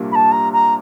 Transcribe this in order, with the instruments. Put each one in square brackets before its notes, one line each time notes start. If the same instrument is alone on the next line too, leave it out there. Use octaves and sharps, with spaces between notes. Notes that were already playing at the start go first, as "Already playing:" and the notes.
Already playing: [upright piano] C2 A#2 G3 A#3 D4
[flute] B5
A5
A#5
A#5